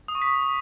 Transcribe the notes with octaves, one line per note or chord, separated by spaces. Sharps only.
D#6
C#6
B6